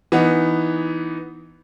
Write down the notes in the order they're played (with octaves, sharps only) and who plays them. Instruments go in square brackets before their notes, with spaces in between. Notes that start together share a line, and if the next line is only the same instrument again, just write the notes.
[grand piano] E3 B3 D#4